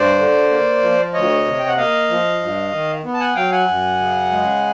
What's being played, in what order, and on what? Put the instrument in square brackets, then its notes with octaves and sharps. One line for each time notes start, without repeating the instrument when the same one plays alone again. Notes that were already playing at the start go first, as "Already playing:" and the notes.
Already playing: [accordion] G2 C5 D5
D3
A#3
F3
D2 C#5 D#5
C3
G5
F#5
A#3 D#5 F5
F3
G2
D#3
B3
A5
F#5 G#5
F#3 F5 G5
F#5 G#5
F#2
C#3
G#3